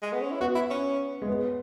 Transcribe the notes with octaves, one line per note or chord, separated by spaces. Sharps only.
G#3
B3
C#4
E4
B3 F#4
E4
C#4
G#3
B3